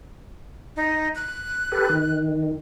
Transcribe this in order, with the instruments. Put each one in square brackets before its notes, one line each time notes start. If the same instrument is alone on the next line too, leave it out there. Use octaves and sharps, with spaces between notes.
[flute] D#4
F#6
[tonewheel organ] G4 A4 B4
D#3